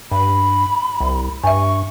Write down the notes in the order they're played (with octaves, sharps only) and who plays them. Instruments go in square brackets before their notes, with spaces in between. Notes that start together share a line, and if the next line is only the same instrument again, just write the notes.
[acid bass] G2 [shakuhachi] B5
[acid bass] C2
[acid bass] G2 [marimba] E5 G#5 [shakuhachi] C#6